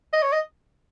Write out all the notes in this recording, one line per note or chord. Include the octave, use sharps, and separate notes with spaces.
D#5
C#5
D#5